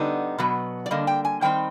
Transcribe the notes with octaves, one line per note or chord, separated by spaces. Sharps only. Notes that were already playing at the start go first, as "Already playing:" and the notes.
Already playing: D3 G3 B3 D#4
B2 F#3 B3
D5
D3 G3 A#3 D#5
G5
G#5
D#3 G3 C4 D#4 G5